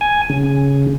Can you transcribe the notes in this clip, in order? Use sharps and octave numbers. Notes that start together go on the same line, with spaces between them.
G#5
C#3